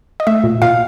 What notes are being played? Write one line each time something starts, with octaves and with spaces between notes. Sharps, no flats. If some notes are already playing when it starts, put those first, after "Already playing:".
D#5
A3 E5
A#2
A#2 F5